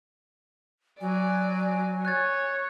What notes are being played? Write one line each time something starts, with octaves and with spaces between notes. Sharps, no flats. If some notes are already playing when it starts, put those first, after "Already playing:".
F#3 D5 G#5
C#5 F#6 G#6 A6